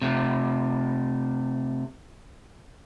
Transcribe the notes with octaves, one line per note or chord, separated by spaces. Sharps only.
C3 A3